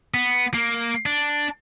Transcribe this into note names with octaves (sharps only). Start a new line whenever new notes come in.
B3
A#3
D4